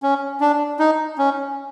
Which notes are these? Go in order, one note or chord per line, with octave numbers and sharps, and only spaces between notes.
C#4
D4
D#4
C#4